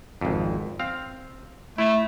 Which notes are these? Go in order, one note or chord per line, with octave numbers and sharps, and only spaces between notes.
G#1 F2
C4 F5
A3 E4